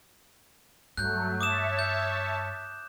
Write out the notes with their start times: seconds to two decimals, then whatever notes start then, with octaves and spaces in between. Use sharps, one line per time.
0.97 G2 F#3 A3 F#6 G6
1.41 C#5 E5 A5 D6 D#6 E7
1.79 G6